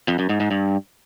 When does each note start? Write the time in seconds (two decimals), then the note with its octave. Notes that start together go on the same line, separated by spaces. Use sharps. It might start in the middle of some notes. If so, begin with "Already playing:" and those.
0.08 F2
0.19 F#2
0.29 G#2
0.40 G#2
0.51 G2